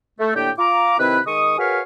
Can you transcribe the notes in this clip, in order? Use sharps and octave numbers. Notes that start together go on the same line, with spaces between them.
A3
A2 D3 A#3 D4 G4 G5
F4 A#5 D6
C3 D#3 C4 E4 B4
D#3 G#3 C#6 D#6
F#4 G#4 A#4 B4 C#5 F5